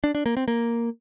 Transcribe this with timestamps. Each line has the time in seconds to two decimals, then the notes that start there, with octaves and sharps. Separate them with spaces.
0.04 D4
0.15 D4
0.26 A#3
0.37 C4
0.48 A#3